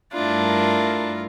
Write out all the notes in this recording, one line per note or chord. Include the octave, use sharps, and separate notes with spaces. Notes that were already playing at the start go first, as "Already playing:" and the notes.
G2 A3 D4 E4 F4 A#4 A5